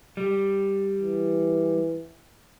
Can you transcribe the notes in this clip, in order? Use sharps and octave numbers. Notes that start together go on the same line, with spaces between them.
G3
E3